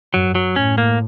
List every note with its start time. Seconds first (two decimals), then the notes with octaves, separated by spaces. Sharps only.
0.14 F#2 F#3
0.35 F#3
0.56 A2 C#4
0.78 A#3